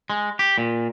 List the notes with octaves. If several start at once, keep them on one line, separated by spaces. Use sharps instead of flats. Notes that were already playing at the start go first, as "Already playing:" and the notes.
G#3
G4
A#2